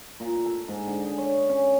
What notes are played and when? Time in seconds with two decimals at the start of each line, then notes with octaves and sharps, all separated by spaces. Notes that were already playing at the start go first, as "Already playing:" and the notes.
0.20 A#2
0.46 A4
0.68 G#2
0.87 D3
1.05 G#4
1.18 C#5
1.49 C#4